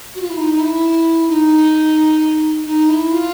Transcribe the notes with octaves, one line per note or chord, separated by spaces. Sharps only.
F#4
F4
E4
D#4
D#4
E4
D#4
D#4
E4
F4